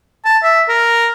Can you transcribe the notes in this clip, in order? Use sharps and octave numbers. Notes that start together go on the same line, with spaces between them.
A5
E5
A#4